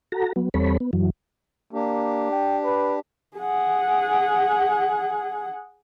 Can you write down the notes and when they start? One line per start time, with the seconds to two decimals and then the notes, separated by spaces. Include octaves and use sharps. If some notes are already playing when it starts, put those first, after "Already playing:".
0.12 F#4 A4 A#5
0.36 F#3 B3
0.54 E2 G3 C4 A4 C#5 B5
0.80 B3
0.93 F#2 E3 F#3
1.73 A#3 D4 G4
2.31 G5
2.64 B4
3.37 G#4 F#5